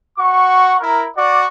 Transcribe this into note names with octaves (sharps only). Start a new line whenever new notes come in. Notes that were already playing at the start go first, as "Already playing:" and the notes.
F#4 F#5 C#6
E4 A#4
F#4 D5